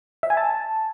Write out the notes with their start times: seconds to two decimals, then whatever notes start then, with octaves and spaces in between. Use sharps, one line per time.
0.23 E5
0.30 G#5
0.37 A5